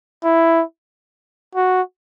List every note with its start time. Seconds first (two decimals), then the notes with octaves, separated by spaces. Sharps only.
0.23 E4
1.55 F#4